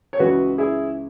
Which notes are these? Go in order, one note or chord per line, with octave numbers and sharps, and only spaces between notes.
C#5
C#2 C#3 E3 F#4 B4
E4 G#4